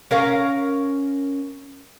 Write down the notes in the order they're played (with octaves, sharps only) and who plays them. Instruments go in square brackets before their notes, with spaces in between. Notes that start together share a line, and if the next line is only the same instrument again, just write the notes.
[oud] C#4 A#4 F5